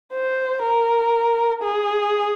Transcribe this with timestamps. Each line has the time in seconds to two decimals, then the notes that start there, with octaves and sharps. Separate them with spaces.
0.13 C5
0.62 A#4
1.63 G#4